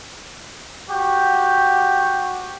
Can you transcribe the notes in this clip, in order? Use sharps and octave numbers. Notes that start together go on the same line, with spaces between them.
F#4 G4